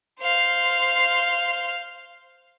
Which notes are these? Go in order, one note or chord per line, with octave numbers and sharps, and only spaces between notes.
C5 F5